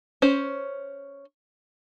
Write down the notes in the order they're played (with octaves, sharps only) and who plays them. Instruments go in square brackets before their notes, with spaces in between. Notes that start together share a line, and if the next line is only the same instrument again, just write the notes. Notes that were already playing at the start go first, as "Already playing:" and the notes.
[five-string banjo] C#4 C5